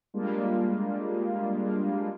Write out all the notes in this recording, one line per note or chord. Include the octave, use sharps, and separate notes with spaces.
G3 G#3 A#3 D4 F4